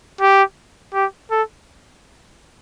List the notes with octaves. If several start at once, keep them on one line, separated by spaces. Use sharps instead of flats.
G4
G4
A4